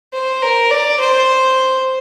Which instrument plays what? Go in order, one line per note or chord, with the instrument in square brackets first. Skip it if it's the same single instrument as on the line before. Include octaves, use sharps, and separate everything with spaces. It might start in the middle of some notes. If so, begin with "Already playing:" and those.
[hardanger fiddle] C5
A#4
D5
C5